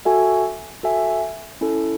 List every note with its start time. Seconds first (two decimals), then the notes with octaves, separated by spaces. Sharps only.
0.05 F#4 A4 E5 G#5
0.83 F#4 A4 E5 G#5
1.61 C#4 E4 A4